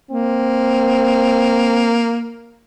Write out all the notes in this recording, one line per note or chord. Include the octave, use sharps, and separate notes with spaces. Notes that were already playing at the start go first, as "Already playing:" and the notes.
A#3 C4